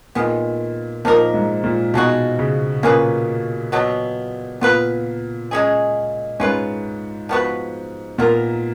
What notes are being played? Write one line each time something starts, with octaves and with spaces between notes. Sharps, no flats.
A#2 D#3 G#3 B3
A#2 F3 A#3 D#4 A#4
G#2
A#2
B2 F3 G#3 D#4 F#4
C#3
A#2 A#3 C#4 G#4 B4
B2 F#3 B3
A#2 B3 F4 B4
G#3 C#4 G#4
G#2 C#4 F4 B4
F3 B3 F#4 B4
A#2 B3 F4 A#4